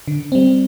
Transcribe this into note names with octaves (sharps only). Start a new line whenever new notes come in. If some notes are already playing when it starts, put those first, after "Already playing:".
D3
G3 C4